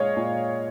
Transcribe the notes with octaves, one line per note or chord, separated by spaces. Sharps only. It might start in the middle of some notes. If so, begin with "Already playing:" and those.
Already playing: A#2 G#3 C#5 D#5 F5
A#2